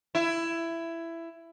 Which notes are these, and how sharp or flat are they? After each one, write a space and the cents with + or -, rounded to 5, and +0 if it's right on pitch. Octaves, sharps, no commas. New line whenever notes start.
E4 +15